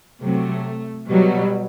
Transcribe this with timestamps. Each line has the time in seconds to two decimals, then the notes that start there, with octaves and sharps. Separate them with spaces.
0.23 C3 F#3 A3
1.09 B2 F#3 G3